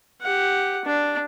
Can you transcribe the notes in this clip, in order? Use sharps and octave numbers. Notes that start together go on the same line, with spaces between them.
G4 F#5
D4